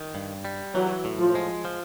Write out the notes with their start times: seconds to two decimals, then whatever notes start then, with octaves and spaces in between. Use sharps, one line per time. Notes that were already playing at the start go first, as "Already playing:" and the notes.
Already playing: D#3
0.15 G2
0.45 G3
0.75 E3 F#3
1.05 A2
1.20 F3
1.35 G#3
1.65 F3